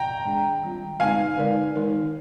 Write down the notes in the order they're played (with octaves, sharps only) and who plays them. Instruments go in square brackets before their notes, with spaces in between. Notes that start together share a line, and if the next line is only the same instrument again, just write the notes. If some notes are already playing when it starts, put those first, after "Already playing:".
Already playing: [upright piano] G5 A#5
[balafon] D#3 G#3 D4 G#4 D5
D#3 G3 C4 F4
[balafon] D3 G#3 C4 D#4 [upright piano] F5 G#5
[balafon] D3 G#3 D#4 A#4 D5
D#3 G#3 D#4 A#4